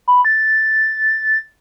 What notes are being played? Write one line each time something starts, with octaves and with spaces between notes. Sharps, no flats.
B5
A6